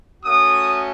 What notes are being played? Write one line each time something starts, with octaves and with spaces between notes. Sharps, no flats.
A3 C#4 F#4 D#6